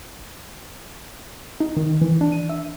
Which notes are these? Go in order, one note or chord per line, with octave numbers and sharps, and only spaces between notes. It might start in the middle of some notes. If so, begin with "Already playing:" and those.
D#4
D#3
E3
D4
D#7
E5